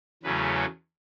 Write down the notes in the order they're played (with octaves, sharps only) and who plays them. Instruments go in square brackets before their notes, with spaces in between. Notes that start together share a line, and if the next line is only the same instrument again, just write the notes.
[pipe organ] E2 C#3 F#3 A3 C#4 B4